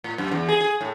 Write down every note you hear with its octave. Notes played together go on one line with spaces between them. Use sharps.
A2
F#2
E2
G#4
G#4
A2